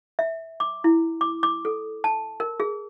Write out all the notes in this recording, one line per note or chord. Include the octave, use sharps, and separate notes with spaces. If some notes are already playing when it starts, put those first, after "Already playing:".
E5
D6
E4
D6
D6
A4
A5
A#4
G#4